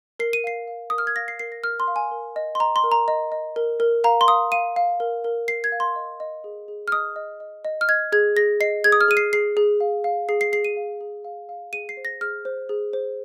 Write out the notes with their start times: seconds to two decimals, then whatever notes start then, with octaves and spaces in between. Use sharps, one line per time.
0.19 A#4 C7
0.33 D#7
0.44 F5 C7
0.68 F5
0.90 A#4 D#6
0.98 F6
1.07 G#6
1.16 F5 A#6
1.28 C7
1.39 A#4 C7
1.52 A#6
1.63 A#4 F6
1.80 C6
1.88 F5
1.96 G#5
2.11 A#4
2.36 D#5
2.55 C6
2.60 D#5 A#5
2.76 C6
2.84 A#4
2.91 A#5
3.08 D#5
3.32 D#5
3.56 A#4
3.80 A#4
4.04 F5 A#5
4.21 C6
4.28 F5 D#6
4.52 F5 D#7
4.76 F5
5.00 A#4
5.24 A#4
5.48 A#4 C7
5.64 G#6
5.72 F5
5.80 C6
5.96 D#5
6.20 D#5
6.44 G#4
6.68 G#4
6.88 F6
6.92 D#5 D#6
7.16 D#5
7.40 D#5
7.65 D#5
7.81 F6
7.88 D#5 G#6
8.12 G#4 G#6
8.36 G#4 A#6
8.60 D#5 C7
8.84 G#4 G#6
8.92 D#6
9.01 F6
9.08 G#4 D#7
9.17 C7
9.33 G#4 C7
9.57 G#4
9.80 F5
10.04 F5
10.29 G#4 C7
10.41 C7
10.53 G#4 C7
10.65 D#7
10.77 F5
11.01 G#4
11.25 F5
11.49 F5
11.73 G#4 D#7
11.89 C7
11.97 C5
12.05 A#6
12.21 G#4 F6
12.45 C5
12.69 G#4
12.93 C5